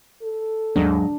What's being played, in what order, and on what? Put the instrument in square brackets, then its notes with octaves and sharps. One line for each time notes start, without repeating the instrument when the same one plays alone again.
[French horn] A4
[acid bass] D#2 [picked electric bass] G#2 F#3 G#3 [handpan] D4